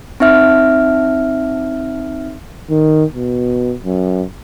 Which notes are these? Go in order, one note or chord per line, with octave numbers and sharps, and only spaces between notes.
C4 D#4 E5 F6
D#3
B2
F#2